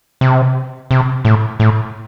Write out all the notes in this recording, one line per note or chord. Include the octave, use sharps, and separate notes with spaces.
C3
C3
A2
A2